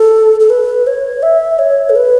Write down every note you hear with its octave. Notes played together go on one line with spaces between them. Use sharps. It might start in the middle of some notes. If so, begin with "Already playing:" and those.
Already playing: A4
A4
B4
C#5
E5
C#5
A4
B4